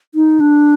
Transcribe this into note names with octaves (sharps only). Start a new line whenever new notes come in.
D#4
D4